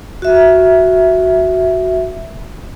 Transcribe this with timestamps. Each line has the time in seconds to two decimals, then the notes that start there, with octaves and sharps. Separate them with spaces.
0.22 F#4 E5